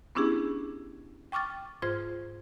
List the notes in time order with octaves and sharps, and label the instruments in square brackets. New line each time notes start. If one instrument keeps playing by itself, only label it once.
[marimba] B3 C#4 D4 E4 G4 G#4
G5 C#6 D6 F6 A6
G#2 F4 C5 F6 G#6